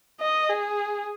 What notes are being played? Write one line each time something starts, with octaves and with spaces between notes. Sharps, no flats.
D#5
G#4